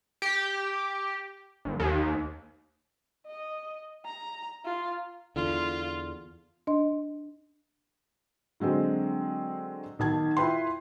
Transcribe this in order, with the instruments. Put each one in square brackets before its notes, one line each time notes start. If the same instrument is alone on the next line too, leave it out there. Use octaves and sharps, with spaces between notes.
[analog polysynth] G4
G1
D#2
[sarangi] D#5
A#5
F4
[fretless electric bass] E2 D3 [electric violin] F4
[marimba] D4 D#5 C6
[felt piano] D3 F#3 G#3 C4
B1 D#3 A5 G#6
E4 F4 B4 G5 C6